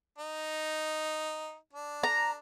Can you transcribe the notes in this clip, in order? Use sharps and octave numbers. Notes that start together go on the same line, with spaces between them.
D#4
D4
A#5